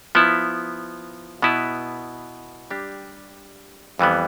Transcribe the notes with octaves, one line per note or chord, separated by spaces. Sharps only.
F3 B3 E4
B2 B3 E4 B4
G3 D4 G4
F2 E3 G3 B3